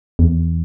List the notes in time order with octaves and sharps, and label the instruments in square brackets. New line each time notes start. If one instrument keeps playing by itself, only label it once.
[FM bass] E2